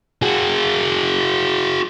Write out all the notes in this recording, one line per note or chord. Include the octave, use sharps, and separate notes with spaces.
F#4 G#4